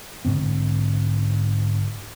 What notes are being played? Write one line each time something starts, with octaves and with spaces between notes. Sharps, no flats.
G#2 D3 C4